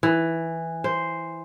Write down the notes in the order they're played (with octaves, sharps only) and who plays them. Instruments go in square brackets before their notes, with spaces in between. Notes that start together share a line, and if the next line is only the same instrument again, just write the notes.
[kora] E3
C5